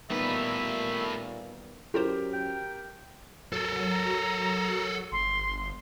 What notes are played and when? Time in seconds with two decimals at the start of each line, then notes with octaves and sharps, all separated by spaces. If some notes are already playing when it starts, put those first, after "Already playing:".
0.10 A#2 D#3 G3 A3 B3 B4 E5
1.94 F#2 E4 F4 G4 A#4 C5
2.33 G5
3.53 F#3 A4 A#4
3.91 A#5
5.12 G1 C6